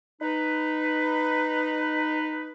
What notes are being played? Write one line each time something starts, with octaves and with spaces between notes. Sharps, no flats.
D#4 B4